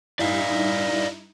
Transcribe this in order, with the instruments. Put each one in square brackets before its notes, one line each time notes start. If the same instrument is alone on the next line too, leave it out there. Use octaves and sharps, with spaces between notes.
[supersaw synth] G2 D#4 E4 [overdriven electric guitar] D5 F5